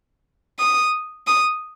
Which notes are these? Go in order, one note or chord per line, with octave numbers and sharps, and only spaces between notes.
D#6
D#6